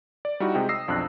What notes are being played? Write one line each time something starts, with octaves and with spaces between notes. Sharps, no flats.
D5
G3 D#4 E4 F#4
C3 G#3 D#5 G5
D#6 E6 A#6 C7
B1 F2 D4 F#6